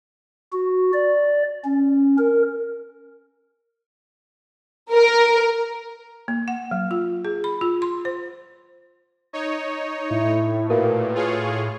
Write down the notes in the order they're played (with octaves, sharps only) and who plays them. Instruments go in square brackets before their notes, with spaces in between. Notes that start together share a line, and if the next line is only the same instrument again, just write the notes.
[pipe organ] F#4
D5
C#4
A#4
[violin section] A#4
[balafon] A#3
F#5
F#3
F4
G#4
B5
F4
C6
C5
[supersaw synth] D#4 C#5
[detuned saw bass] A2 [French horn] E4
[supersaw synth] A#2 [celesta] F#4 A#4 F5 [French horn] B4
[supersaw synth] F4 G#4 C#5